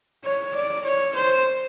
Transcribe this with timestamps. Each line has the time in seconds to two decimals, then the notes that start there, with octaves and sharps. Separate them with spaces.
0.25 C#5
0.55 D5
0.85 C#5
1.15 C5